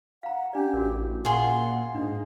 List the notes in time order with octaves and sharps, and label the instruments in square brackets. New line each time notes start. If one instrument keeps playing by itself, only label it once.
[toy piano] F5 A#5 [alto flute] F#5
[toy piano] C#4 D4 D5 [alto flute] G4
[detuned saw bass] A1 [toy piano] F#4 A#4
[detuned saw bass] A#2 [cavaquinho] F4 G#4 C6 [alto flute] F#5
[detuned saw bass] G#2 [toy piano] D4 [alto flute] D#4